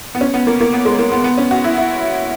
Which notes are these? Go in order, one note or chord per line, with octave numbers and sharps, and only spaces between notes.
B3
C#4
B3
A#3
A#3
B3
G#3
A#3
B3
B3
C#4
F#4
E4
E4